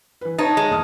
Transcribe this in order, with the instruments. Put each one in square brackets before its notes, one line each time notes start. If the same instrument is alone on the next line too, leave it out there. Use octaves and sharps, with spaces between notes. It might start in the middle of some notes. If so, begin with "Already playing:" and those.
[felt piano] E3 B4
[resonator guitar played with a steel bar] D#4 [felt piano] C#5 A#5 [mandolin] A5
[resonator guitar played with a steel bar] G#3
[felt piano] E1 D#6 F6